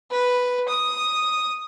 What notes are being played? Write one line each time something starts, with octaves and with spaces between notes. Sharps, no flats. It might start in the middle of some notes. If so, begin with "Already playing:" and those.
B4
D#6